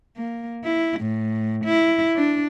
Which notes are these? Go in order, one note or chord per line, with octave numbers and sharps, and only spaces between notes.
A#3
E4
A2
E4
D4